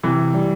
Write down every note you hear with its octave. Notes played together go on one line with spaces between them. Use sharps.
C3 E3
G3